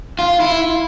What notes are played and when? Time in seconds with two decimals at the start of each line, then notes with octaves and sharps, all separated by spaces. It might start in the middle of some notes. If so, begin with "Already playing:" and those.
0.19 F4
0.40 E4